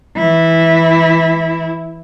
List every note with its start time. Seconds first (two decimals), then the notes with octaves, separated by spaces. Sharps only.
0.17 E3 E4